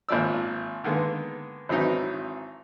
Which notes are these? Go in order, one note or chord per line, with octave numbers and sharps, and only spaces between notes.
G#1 A#2 F3 D5 E6
D3 D#3 G#3 A#3 B3
G#1 E3 F#3 C4 D#4 E4